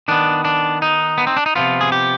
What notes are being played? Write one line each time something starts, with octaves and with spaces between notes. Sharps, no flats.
D#3 B3 D4
D4
D#4
B3
C4
D4
D#4
C3 F3 B3 F4
G#4
G4